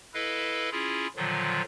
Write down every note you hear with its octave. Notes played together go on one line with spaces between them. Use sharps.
E4 A4 B4 D#5 F5
C#4 E4 F4 G#4
A#2 D3 D#3 F3 F#3 F4